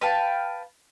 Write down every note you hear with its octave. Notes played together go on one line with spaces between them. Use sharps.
B4 F5 G5 A5